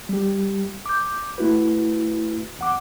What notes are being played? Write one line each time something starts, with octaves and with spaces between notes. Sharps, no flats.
G3 G4
D6 G6
A3 E4 F#4 B4
E2 F#5 D6